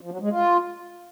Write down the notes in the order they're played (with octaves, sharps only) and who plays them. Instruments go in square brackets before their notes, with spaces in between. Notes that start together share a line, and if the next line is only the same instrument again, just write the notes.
[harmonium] F3
F#3
G#3
F4